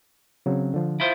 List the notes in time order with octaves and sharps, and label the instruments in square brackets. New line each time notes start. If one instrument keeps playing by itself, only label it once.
[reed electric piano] C#3 F#3 C4
D3 F3
[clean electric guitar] E4 F4 C5